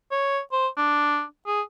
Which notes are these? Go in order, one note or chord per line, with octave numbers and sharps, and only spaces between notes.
C#5
C5
D4
G#4